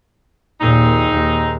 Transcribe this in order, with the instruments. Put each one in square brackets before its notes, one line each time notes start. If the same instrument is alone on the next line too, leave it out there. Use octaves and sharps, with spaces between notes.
[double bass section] D#2 A#2 [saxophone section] G#3 C4 D#4
[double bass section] D#2